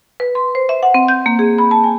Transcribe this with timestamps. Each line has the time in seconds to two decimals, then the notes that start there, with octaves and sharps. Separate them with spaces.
0.20 B4
0.35 C6
0.55 C5
0.69 E5
0.83 F#5
0.94 C4
1.08 G6
1.26 A#3
1.39 G#4
1.58 B5
1.71 A5
1.84 G#5